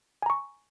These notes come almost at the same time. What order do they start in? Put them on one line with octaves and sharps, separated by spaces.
G#5 A#5 C#6